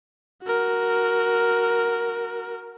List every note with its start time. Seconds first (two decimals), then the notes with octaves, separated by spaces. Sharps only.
0.43 F#4 A#4